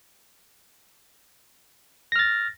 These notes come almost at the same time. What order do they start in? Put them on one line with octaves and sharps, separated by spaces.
A#6 F6 A6